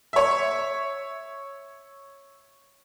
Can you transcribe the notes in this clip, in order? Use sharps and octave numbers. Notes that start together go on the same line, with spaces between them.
C#5 E5